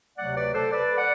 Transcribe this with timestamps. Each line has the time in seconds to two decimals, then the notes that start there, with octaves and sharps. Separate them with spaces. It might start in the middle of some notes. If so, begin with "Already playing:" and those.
0.18 D2 C3 F#3 A3 D5 F#5
0.36 B4 D5
0.54 A4 C5
0.72 B4 D5
0.98 D5 F#5